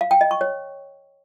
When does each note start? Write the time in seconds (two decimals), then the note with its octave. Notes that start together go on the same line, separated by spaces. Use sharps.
0.01 F5
0.11 G5
0.21 D#5
0.31 C#6
0.41 C#5